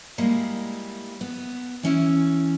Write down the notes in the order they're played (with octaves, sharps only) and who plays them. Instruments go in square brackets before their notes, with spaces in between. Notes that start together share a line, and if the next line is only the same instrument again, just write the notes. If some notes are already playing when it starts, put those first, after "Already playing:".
[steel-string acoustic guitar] G3 G#3 A#3 E4
B3
E3 C#4 E4